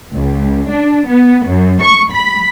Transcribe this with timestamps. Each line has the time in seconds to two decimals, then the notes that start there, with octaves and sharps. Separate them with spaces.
0.14 C#2
0.72 D4
1.08 B3
1.48 F#2
1.83 C#6
2.14 B5